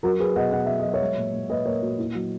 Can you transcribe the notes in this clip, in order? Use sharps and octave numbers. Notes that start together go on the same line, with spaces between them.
F#3 F#4 A#4
F#3 G#4 B4
B2 D#5 F#5
B2 F#5
F#3 E5
D#5
F#3
C#5 E5
G#3
A#2
A#2
A#2 B4 D#5
A#2 A#4 C#5
A#2 F#4
A#2 E4
F#3 F#4